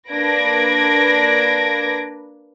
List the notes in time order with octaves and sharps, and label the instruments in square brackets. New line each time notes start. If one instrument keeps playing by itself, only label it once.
[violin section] A#3 D4 B4 G#6 A#6 D7